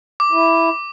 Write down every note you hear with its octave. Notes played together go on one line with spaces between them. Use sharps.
D6
E4